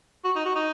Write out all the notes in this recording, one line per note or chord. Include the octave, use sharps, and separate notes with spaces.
F#4
D#4
F#4
D#4